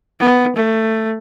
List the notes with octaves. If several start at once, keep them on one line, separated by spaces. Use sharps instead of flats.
B3
A3